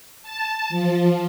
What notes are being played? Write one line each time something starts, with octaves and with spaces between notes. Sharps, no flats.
A5
F3